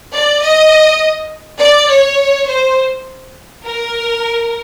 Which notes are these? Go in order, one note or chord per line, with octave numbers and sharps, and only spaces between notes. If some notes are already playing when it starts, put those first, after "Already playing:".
D5
D#5
D5
C#5
C5
A#4